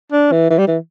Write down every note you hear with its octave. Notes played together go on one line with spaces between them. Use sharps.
D4
E3
E3
G3
E3